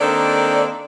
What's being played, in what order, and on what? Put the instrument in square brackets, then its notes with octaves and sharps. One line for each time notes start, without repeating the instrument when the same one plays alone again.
[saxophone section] D#3 A#3 C4 D4 A4 D5